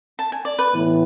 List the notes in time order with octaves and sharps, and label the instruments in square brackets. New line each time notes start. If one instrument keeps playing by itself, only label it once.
[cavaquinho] A5
G#5
D5
B4
[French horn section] A2 E3 B3